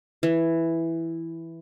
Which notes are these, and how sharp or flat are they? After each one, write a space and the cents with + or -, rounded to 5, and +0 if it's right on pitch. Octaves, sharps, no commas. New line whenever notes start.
E3 +0